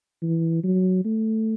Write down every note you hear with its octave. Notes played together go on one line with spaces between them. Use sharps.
E3
F#3
A3